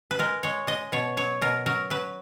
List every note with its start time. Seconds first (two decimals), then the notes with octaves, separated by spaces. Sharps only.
0.11 B4
0.19 G#3 A#4
0.43 G#3 C#5
0.67 G#3 D#5
0.92 B2 C#5
1.17 F#3 C#5
1.41 B2 A#4
1.66 F#3 A#4
1.90 F#3 B4